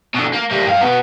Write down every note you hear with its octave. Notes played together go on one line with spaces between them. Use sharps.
B2 D3
A#3
G3 A#3
G2 F5
B2 B3